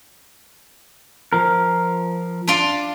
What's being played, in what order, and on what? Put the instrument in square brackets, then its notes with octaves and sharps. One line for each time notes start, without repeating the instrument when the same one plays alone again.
[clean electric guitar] F3 A#4
[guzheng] D4 F4 D5